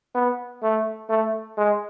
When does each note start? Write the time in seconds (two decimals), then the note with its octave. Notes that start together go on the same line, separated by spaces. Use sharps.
0.14 B3
0.62 A3
1.09 A3
1.57 G#3